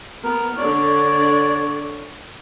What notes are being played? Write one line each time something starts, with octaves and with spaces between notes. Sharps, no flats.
B3 A#4
D3 D4 C#5 D5